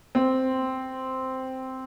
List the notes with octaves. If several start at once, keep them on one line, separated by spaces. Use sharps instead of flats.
C4